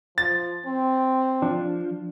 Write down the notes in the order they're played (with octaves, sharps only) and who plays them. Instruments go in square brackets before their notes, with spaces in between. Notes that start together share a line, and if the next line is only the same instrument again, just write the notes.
[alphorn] F3 [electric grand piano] A6
[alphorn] C4
[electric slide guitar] F3 [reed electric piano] D4